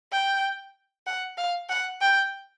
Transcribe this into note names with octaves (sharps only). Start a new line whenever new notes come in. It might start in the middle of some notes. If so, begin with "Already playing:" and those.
G5
F#5
F5
F#5
G5